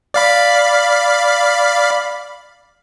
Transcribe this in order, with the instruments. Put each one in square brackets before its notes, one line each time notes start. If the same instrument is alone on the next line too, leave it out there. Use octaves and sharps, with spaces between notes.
[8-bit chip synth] D5 F5 B5